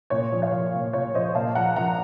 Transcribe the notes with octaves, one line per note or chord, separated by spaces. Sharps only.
A#2 C#5
F3
C#5 F5
F3
A#2
A#2 C#5
F3 C5 D#5
A#2 F5 A5
F3 F#5 A#5
F3 F#5 A#5